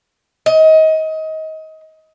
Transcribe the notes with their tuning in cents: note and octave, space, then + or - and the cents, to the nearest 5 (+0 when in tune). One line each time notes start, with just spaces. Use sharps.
D#5 +25